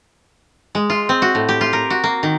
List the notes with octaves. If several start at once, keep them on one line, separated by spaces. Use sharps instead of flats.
G#3
F4
C4
F#4
A2
G4
F4
A#4
F#4
A#3
D#3